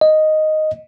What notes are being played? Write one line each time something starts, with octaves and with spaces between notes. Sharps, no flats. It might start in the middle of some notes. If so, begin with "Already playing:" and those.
D#5